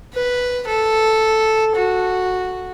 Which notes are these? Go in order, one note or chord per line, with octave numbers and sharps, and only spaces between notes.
B4
A4
F#4